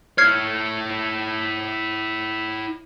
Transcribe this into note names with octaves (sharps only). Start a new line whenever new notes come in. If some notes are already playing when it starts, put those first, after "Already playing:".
E4 C#5 F6 G#6 C7